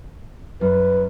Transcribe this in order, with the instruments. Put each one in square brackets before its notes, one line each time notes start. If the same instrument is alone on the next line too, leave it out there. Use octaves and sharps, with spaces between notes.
[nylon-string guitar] F#2 [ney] B4